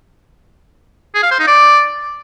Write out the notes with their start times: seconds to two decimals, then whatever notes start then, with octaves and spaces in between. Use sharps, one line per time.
1.15 G#4
1.23 F5
1.31 C5
1.39 D#4
1.47 D5